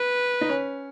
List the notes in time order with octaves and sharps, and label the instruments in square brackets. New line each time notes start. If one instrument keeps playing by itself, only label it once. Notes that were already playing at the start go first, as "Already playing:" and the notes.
Already playing: [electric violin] B4
[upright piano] D#4
C#4